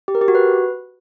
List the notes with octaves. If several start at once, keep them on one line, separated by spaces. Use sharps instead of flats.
G4
A#4
G4
F#4
B4